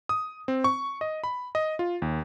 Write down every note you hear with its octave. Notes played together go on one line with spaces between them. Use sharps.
D#6
C4
C#6
D#5
B5
D#5
F4
D#2